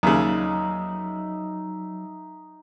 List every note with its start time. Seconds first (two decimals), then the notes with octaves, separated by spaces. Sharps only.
0.03 D#2 C#3 F#3 D#4 E5